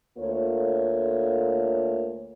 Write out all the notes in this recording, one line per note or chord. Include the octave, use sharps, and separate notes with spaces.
D2 A3 A#3 F4 C#5